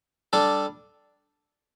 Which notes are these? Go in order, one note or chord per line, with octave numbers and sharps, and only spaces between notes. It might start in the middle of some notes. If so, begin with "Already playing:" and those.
G3 D4 A4